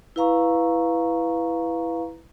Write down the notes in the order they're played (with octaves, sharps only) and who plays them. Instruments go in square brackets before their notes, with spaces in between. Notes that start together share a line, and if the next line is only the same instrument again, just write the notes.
[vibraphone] E4 B4 F5 A#5 C#6